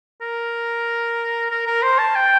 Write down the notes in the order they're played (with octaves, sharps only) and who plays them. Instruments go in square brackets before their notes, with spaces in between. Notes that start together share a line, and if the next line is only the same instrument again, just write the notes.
[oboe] A#4
A#4
A#4
C5
A5
G5